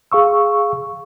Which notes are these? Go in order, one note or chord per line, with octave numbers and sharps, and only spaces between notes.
G#4 F5 C#6 E6